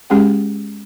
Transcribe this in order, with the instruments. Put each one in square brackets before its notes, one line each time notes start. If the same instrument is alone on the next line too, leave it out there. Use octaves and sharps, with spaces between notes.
[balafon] G#3 C#4 G4 G#4 F#5 G5